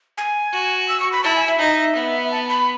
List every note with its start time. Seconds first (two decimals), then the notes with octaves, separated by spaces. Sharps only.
0.18 G#5
0.53 F#4
0.89 E6
1.00 C#6
1.12 B5
1.24 E4 A5
1.36 G#5
1.47 E5
1.59 D#4
1.96 B3
2.31 A5
2.49 B5